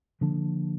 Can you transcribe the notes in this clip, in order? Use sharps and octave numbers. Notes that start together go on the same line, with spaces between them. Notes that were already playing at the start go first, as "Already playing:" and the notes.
D3 F3 A#3 D4